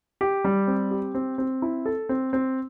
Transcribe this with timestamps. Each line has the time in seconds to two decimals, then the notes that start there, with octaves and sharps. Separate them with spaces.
0.21 G4
0.45 G3
0.67 C4
0.91 G4
1.15 C4
1.38 C4
1.62 E4
1.86 A4
2.09 C4
2.33 C4